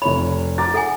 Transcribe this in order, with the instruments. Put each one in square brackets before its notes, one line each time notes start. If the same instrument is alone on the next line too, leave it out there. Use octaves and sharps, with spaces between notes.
[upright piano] F1 C#5 [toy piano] B5
[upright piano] A#5 D6 A6
[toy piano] A4 F#5 G#5